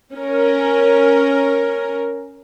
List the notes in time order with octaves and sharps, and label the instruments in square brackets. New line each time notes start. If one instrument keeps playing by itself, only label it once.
[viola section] C#4 A#4